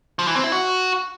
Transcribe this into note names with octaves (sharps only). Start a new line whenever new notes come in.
F3
E3
C4
E4
F#4